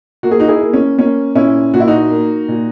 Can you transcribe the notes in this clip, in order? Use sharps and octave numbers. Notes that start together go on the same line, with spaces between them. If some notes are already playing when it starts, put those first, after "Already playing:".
A#3 F#4
G#4
D#4 F#4
E4 G#4
A#3
C#4
A#3 C#4
A#2 C#4 E4
A#2 F#4
E4
D#4 F#4
A#3
A#2